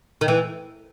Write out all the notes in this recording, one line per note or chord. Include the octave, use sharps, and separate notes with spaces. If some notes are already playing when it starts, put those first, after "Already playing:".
D#3
E3